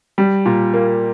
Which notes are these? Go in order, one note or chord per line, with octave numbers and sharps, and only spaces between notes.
G3
A#2
A#3